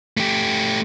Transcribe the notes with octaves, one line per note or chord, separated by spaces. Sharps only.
A3 G4